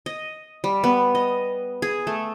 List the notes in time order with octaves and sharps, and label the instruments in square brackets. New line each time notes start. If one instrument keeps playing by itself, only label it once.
[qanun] D#5
G3
B3
D#5
G#4
A3